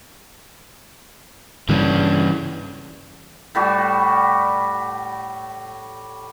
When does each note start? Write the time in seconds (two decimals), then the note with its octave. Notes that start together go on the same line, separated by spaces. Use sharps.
1.69 G2 C#3 E3 D4
3.55 A2 G3 F#4